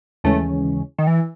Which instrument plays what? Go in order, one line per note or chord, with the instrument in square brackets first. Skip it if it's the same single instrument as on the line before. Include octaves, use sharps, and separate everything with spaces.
[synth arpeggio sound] D#2 C#3 E3 G#3 C#4 [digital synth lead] A3
[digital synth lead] D#3
E3